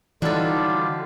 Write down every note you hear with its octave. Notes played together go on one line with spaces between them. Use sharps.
D3 E3 F#3 G3 D4 D#4 F4 A4